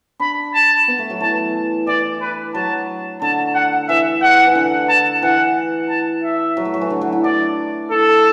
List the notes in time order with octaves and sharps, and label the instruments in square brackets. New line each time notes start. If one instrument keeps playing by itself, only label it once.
[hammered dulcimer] D4 [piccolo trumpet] B5
[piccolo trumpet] A5
[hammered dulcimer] B3
A3
F#3
[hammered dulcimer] E3 [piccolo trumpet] A5
[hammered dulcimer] E3 [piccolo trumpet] D5
[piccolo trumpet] B4
[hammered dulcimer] F#3 [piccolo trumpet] A5
[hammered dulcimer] D3 [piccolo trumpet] A5
[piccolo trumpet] F#5
[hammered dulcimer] E3 [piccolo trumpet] E5
[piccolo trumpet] F#5
[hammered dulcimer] E3
D3
[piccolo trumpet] A5
[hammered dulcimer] E3 [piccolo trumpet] F#5
[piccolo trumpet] A5
E5
[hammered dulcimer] F#3
A3
F#3
E3
D3
F#3
E4
[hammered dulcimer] D4 [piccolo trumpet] D5
[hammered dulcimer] E4 [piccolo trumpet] A4